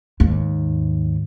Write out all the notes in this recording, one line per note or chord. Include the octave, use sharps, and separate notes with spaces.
D#2 G#2